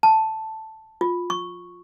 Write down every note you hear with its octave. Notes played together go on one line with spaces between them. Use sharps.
A5
F4
C#6